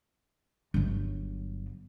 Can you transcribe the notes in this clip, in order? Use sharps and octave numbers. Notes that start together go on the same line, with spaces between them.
G1 F#3